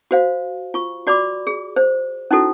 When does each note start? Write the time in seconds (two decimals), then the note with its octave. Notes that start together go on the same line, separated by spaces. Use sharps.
0.11 F#4 C5 F5
0.74 F4 C#6
1.07 F#4 D5 B5 C6 D6
1.47 G#4
1.76 C5
2.31 C#4 D#4 E4 F#4 A4